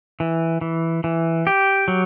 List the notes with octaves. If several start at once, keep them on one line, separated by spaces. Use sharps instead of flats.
E3
E3
E3
G4
F#3